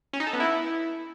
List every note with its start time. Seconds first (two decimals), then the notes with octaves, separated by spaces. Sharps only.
0.13 C#4
0.20 D#4
0.27 A4
0.33 B3
0.40 E4